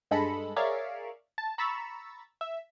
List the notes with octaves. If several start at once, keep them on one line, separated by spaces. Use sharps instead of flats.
G2 G#3 A4 B5 A#6 C#7
G#4 A#4 C#5 D5 E5 F5
A5
A#5 B5 C#6 E6 A6 B6
E5